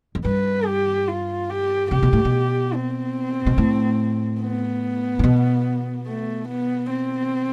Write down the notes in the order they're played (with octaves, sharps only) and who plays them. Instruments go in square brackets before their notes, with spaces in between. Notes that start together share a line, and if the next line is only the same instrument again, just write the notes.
[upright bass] F2
[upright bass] G2 [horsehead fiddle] B4
[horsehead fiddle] G4
F4
G4
[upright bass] C3 [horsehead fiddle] G4
[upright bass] B2
A2
B2
[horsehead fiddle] C4
[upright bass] B2
A2
[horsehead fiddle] B3
[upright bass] A2
B2
[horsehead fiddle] A3
B3
C4